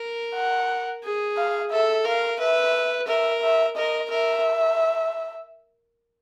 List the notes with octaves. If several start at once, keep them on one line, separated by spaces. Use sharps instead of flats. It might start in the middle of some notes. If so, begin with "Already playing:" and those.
Already playing: A#4
F#5
G#4
F5
A4 E5
A#4 F5
B4 E5
A#4 E5
E5
A#4 D#5
A#4 E5